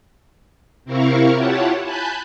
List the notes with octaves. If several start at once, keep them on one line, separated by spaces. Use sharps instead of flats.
C3 C4 E4 A#4 F5 C#6
E4 F4 G4 C#5 F#5 A5
G#5 A5 B5 F#6 G6